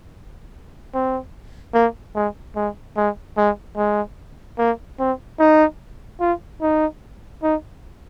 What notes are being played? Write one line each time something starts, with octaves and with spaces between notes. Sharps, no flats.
C4
A#3
G#3
G#3
G#3
G#3
G#3
A#3
C4
D#4
F4
D#4
D#4